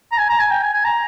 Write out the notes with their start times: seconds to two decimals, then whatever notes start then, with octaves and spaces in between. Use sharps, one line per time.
0.12 A#5
0.18 G#5
0.29 A#5
0.39 G#5
0.51 G5
0.62 G#5
0.74 G#5
0.85 A#5